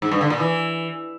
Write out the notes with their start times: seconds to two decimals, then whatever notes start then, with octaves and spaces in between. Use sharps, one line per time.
0.02 G#2
0.12 G2
0.21 D3
0.30 A#2
0.40 E3